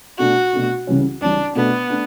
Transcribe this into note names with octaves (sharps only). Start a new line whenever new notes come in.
B2 A3 D4 F#4
B2 A3 D4
C#2 C#3 E3 G3 C#4
C#2 C#3 E3 G3 C#4 D4
B2 A3 B3 D4
A3 D4